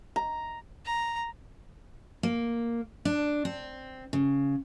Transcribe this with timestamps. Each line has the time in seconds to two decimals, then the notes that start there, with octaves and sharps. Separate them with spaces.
0.16 A#5
0.85 A#5
2.23 A#3
3.05 D4
3.45 C4
4.13 C#3